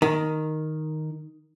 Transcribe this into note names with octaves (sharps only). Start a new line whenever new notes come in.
D#3